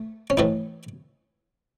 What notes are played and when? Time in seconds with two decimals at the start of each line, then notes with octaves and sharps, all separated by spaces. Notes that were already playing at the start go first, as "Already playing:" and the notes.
Already playing: A3
0.30 C#4
0.37 A2 E3 A3 D#4